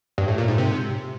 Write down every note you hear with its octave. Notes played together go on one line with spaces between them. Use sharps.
G2
A2
A#2
G#2
C3